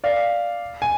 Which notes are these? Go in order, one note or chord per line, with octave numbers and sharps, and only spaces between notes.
D5 F5
G#5